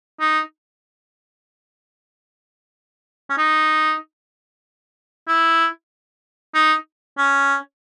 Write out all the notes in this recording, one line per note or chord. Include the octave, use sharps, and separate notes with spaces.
D#4
C#4
D#4
E4
D#4
C#4